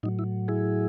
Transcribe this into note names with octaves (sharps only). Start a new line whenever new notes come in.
A2 F#3 D#4
E4
E4 G#4